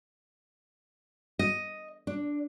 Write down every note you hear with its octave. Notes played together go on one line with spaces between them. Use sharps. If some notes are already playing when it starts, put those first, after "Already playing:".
D#5
D4